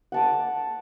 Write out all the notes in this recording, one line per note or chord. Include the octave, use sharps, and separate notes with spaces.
F#5 A5 D6